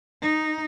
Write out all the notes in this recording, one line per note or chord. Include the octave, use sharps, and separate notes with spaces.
D#4